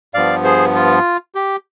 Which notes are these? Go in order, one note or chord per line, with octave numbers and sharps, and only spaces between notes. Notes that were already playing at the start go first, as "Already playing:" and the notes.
G2 F3 B3 D5 F5
G#4 C5
F4
G4